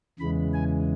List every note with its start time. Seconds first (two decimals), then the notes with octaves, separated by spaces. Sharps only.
0.19 E2 C#3 E3 G#3 B5
0.54 G#5